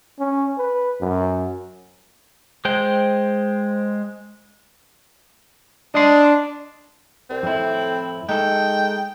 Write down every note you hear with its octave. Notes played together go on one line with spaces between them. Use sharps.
C#4
B4
F#2
G#3 C5 G5
D4 D#5 C6
C2 C4
F2 A2 E4
G#3 D#4 A4 G5